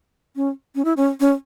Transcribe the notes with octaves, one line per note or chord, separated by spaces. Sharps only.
C#4
C#4
E4
C#4
C#4